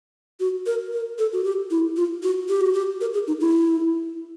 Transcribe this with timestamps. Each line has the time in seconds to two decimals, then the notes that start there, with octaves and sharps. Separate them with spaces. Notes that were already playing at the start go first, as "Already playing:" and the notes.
0.40 F#4
0.66 A#4
0.93 A#4
1.19 A4
1.33 F#4
1.44 G4
1.71 E4
1.97 F4
2.23 F#4
2.49 G4
2.61 F#4
2.73 G4
3.01 A#4
3.14 G#4
3.27 D#4
3.40 E4